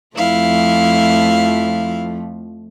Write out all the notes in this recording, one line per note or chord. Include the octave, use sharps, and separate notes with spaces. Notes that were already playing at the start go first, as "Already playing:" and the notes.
F2 F3 A3 E4 F5